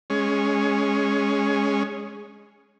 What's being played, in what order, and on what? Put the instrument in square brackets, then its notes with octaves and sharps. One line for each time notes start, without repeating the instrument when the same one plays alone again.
[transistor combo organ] G#3 C#4